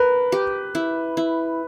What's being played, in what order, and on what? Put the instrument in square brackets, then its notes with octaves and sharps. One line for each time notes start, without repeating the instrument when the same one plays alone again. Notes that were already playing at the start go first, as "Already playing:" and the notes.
Already playing: [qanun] A#4 [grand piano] B4
[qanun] G4
E4
E4